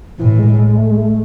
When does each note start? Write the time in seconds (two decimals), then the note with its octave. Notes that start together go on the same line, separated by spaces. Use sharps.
0.19 A2 E3
0.39 G#3
0.59 G#3
0.78 A3
0.91 G#3
0.97 A3